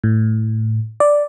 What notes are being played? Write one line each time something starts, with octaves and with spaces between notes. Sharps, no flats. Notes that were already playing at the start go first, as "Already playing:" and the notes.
A2
D5